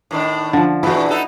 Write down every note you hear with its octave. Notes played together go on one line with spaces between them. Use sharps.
A2 D#3 D4
D3 F3
E2 A#2 A3 E4 F#4
B3 D#4 A4